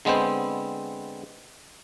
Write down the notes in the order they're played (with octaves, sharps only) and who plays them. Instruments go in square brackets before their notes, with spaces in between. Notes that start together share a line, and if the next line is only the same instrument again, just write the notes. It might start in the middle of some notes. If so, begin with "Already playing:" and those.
[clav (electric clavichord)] D3 G#3 B3 C4 C5